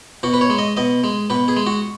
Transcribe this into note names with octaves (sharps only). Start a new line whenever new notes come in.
B2 F#4
B4
C#5
G#3
D#5
B2 D#5
G#3
B2 B4
G#4
G#3
F#4